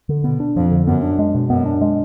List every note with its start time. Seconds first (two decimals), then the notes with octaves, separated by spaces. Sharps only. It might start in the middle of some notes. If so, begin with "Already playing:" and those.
0.09 D3
0.24 B2 B3
0.40 D4
0.56 F2 F3
0.71 D3
0.87 F#2 B3
1.03 D4
1.19 G#3
1.35 B2
1.50 F#2 B3
1.66 D4
1.81 G#3